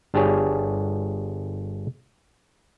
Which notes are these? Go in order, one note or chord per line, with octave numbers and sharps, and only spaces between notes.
G1 D4 G4 G#4 C#5